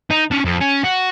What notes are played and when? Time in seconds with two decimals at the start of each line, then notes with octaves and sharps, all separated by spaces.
0.10 D#4
0.31 C#4 D4
0.45 F2
0.61 C#4
0.84 F#4